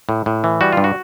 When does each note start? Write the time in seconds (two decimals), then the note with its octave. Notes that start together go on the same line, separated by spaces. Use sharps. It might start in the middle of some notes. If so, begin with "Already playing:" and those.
0.09 A2
0.26 A2
0.44 E3
0.61 G3 F#4
0.72 G2 F4
0.84 F#4